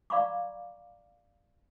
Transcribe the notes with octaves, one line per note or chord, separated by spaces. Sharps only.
D5 F5 A#5 B5 C#6 D6